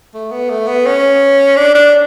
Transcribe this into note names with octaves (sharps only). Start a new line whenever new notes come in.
A3
B3
A3
B3
C#4
D4
D4